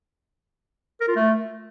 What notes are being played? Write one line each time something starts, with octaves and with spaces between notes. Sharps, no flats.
A#4
F4
A3